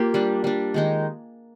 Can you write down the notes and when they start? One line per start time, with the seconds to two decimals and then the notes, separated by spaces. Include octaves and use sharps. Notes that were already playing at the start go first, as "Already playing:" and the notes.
Already playing: A#3 F4 G4
0.14 G3 D4
0.44 G3 D4
0.74 D#3 G#3 D#4